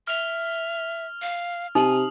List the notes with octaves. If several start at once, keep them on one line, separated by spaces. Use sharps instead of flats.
E5 F6 F7
F5
C3 D#4 G#5 D#6 F#7